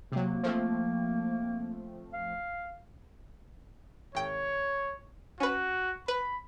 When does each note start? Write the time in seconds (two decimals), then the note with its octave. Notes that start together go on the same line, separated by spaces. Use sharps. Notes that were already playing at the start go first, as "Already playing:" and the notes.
0.12 C3 F#3 A#3
0.43 F3 A3 C4
2.13 F5
4.15 G#1 C#5 G5
5.40 C#4 F#4 B4
6.08 B4 B5